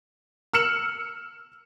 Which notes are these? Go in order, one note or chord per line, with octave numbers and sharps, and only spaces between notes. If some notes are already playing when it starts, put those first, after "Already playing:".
E6 F6 C#7 E7 F#7